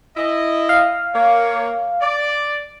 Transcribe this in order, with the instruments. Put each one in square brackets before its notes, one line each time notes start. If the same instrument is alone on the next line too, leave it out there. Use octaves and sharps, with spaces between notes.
[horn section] E4 D#5
[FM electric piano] F5
[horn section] A#3 C#5
D5